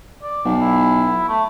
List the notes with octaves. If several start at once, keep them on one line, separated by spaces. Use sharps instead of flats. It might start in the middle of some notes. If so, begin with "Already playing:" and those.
D5
B1
E4
A3